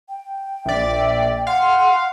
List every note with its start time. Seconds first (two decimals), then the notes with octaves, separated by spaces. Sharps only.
0.09 G5
0.66 A#1 D5 E5
1.47 F5 F#5 C6